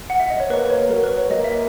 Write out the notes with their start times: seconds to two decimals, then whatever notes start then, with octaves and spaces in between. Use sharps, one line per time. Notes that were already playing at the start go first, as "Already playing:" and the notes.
0.10 F#5
0.20 E5
0.30 D#5
0.40 C#5
0.50 A#3 B4
0.66 B4
0.70 C#5
0.91 F#3 A#4
1.04 B4
1.18 C#5
1.30 A#3 D#5
1.44 E5